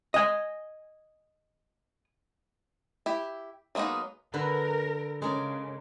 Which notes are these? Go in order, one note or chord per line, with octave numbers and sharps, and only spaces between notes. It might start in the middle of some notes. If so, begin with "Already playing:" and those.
D#5 G#5
E4 G4
F#3 G#3 A#3 B3 D#4
D3 A#4 B4
C#3 G#3 A#4 D5